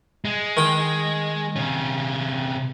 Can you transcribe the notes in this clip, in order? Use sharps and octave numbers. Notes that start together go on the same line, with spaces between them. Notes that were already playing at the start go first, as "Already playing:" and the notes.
G#3
D#3 G5
C3 C#4